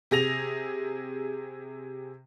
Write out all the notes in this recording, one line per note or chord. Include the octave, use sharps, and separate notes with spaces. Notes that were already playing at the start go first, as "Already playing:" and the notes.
C3 G#4 A#6 F7